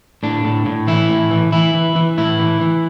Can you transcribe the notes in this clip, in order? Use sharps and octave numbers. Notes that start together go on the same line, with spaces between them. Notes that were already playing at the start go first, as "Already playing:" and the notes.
A2 D4
A2
A2
E3 E4
A2
E3
E3 E4
E3
E3
A2 E4
E3
E3